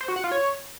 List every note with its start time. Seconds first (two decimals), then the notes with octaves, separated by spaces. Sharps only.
0.01 C5
0.08 F#4
0.16 F#5
0.24 F4
0.32 C#5